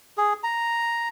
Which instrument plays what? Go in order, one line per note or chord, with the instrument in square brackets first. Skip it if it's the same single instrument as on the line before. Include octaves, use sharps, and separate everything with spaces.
[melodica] G#4
A#5